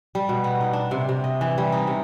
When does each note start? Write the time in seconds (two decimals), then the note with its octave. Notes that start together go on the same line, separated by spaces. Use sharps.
0.15 G3
0.29 B2
0.44 B3
0.61 D#4
0.73 D4
0.91 C3
1.09 C3
1.24 D#5
1.41 E3
1.58 G3
1.72 D#4
1.87 C3